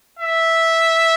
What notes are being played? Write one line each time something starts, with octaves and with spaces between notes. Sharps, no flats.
E5